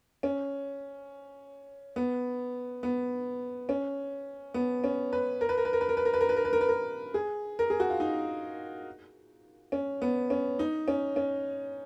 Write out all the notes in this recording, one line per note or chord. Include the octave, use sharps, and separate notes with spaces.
C#4
B3
B3
C#4
B3
C#4
B4
A#4
B4
A#4
B4
A#4
B4
A#4
B4
A#4
B4
A#4
B4
A#4
B4
A#4
B4
A#4
G#4
A#4
G#4
F#4
F4
D#4
C#4
B3
C#4
D#4
C#4
C#4